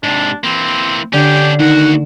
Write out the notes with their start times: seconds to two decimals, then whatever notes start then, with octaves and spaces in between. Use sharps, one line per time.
0.03 G#2 C3 D4
0.44 E3 A#3 C4
1.13 D3 C#4 D4 G4
1.59 D2 D#3 F#4 F#5